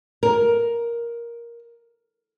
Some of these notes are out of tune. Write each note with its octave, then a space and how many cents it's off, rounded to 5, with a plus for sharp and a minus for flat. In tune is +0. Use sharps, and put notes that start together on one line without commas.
A#4 +10